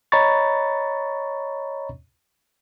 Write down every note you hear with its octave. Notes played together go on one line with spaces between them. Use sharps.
C#5 D#5 A#5 B5 C#6 A6